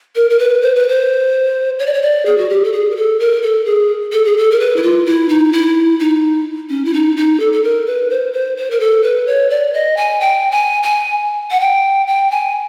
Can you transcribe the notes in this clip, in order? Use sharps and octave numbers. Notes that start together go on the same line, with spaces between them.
A#4
A#4
B4
C5
B4
C5
C#5
D5
C#5
D5
G#4
F#4
G4
A4
G#4
A#4
A4
A#4
A4
G#4
A4
G#4
A4
A#4
B4
E4
F4
E4
D#4
E4
D#4
C#4
E4
D#4
D#4
A4
A4
A#4
B4
C5
C5
C5
A#4
A4
B4
C#5
D5
D#5
G#5
G5
G#5
G#5
F#5
G5
G5
G#5